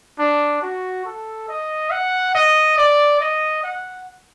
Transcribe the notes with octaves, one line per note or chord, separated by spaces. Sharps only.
D4
F#4
A4
D#5
F#5
D#5
D5
D#5
F#5